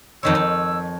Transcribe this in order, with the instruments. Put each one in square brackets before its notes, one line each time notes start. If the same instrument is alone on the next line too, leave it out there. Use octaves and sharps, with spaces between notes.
[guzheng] F2 D#3 C#5 [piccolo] E6
[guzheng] F2